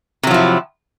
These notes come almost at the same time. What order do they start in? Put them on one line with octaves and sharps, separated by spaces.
C3 F#3 F3 E4